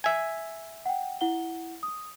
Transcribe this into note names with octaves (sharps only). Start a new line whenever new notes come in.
E5 G#5
F#5 G5
E4 F#5 G7
D#6